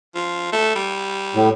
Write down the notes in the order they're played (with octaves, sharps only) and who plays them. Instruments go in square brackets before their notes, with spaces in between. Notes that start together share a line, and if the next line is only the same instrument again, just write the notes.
[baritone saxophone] F3
A3
G3
[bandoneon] A2